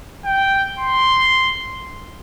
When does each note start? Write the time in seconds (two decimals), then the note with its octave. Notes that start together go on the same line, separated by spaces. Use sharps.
0.25 G5
0.80 C6